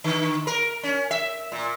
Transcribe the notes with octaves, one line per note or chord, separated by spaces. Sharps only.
D3
A#4
C#4
E5
A#2